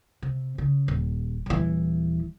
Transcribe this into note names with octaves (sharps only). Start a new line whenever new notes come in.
C3
C#3
D#1
D#1 E3